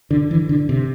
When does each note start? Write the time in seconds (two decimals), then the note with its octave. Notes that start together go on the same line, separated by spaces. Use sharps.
0.11 D3
0.31 E3
0.49 D3
0.69 C3